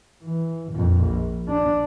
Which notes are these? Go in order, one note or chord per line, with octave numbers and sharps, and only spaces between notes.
E3
F2 A#2
A#1
D4